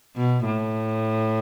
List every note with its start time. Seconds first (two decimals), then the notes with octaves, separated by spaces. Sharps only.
0.16 B2
0.45 A2